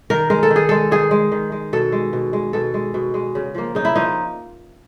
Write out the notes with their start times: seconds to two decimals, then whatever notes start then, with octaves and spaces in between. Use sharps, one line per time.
0.10 D#3 A#4
0.30 G#3 A#4
0.43 A4
0.51 D#3
0.56 G#4
0.69 G#3 A4
0.91 D#3 G#4
1.11 G#3
1.32 D#3
1.52 G#3
1.73 B2 A4
1.92 G#3
2.13 B2
2.33 G#3
2.53 B2 A4
2.74 G#3
2.94 B2
3.14 G#3
3.35 C#3
3.55 F3 A#3
3.75 C#3 D#4
3.85 E4
3.96 F3 A#3 D#4